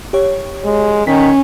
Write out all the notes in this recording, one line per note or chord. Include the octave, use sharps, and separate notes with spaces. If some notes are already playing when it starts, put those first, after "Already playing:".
G4 C#5
G#3
D#3 C#4 B6